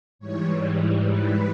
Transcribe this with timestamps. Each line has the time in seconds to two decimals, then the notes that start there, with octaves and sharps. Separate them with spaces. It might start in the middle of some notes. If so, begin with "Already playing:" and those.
0.19 G#2 E3 G3 C#5
1.06 B4